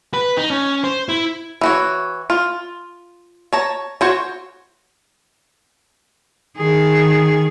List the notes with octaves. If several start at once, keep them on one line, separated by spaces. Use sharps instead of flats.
B4
D#4
C#4
C5
E4
E3 F#4 C#5
F4
C#5 A5 A#5
F#4 C5 C#5
D#3 G#4